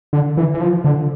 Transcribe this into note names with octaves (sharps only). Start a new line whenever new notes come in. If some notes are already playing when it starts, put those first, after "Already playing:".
D3
E3
E3
F3
D3